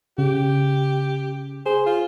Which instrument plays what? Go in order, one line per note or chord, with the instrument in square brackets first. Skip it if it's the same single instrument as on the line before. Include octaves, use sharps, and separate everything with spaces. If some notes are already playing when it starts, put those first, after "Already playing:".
[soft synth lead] C#3 [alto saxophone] G4
[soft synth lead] G#4 [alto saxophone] C5
[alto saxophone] F4